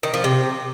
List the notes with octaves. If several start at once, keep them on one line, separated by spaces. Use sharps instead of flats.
D#3
F3
C3